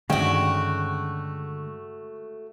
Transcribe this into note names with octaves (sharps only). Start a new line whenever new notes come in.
G2 D3 D#3 G#3 A3 C#4 F#4 G5